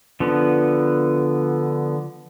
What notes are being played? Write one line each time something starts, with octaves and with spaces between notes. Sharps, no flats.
D3 F3 B3